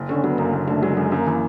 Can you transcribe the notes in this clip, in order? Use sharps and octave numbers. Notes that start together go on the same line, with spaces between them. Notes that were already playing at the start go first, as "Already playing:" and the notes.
Already playing: F#1
D3 C#4
F#3 B3
F#2 A#3
F#1
D3 A3
F#3 G#3
F#2 G#3
F#2 A#3
E3